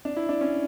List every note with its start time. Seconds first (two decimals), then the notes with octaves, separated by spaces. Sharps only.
0.05 D4
0.16 E4
0.29 D4
0.41 C#4